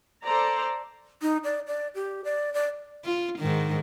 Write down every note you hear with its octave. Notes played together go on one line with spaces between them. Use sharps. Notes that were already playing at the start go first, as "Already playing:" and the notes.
A4 C5 D5 A#5
D#4
D5
D5
G4
D5
D5
F4
G#2 D#3